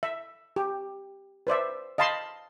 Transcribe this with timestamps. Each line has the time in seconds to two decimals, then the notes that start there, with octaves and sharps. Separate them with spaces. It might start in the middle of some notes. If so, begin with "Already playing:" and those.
0.03 E5
0.56 G4
1.47 B4 C5 D5 E5
1.98 D#5 F5 A5 B5 C6